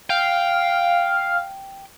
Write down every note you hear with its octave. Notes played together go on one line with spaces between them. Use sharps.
F5 G5